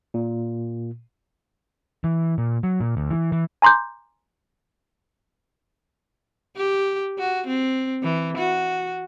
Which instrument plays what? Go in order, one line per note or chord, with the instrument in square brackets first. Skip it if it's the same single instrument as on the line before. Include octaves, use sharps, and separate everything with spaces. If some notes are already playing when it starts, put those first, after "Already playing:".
[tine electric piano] A#2
[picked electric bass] E3
A#2
F#3
A#2
D2
E3
E3
[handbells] G#5 A#5 C6 D6 G6
[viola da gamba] G4
F#4
C4
E3
F#4